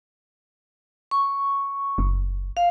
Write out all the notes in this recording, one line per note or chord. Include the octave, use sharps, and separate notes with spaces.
C#6
F#1
F5